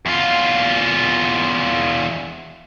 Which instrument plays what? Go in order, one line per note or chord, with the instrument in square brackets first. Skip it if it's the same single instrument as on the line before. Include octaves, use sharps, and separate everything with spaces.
[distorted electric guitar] E2 F4